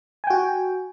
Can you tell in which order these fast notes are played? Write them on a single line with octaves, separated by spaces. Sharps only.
G#5 G5 F#4